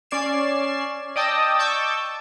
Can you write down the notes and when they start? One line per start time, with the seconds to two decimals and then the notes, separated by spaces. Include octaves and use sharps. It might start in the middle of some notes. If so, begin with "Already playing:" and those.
0.11 C#4 D5 G#6 C7 E7
1.16 D5 D#5 G5 A5 D#6 E6
1.59 A5 C#6 D6 E6 G6